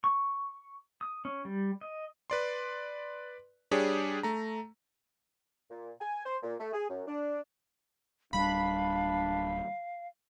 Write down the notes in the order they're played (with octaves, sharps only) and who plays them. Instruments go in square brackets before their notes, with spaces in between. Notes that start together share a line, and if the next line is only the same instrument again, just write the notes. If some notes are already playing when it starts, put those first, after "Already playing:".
[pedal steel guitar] C#6
D#6
C#4
G3
D#5
[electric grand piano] B4 D5 C6
G3 D4 G4 G#4 C#5
A3 A#5
[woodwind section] A#2
G#5
C5
A#2
A3
G#4
F#2
D4
[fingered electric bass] D1 G3 [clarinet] D4 [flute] F5 [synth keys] B5